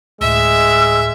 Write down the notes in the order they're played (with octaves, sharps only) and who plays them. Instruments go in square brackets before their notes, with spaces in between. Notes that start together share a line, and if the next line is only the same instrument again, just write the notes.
[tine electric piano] D2 A2 [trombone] G#3 [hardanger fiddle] E5 [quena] E6